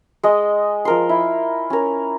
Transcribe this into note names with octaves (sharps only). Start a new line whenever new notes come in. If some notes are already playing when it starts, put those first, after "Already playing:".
G#3 D#5
F3 A#4 C6
E4
C#4 A#4